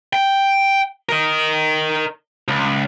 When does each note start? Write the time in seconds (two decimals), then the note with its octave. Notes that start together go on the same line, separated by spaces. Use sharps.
0.13 G5
1.09 A#4 D#5
2.48 C#2